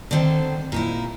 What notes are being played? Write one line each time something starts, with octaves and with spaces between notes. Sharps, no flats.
D3 D#3 C4 A4
A#2 D#4 E4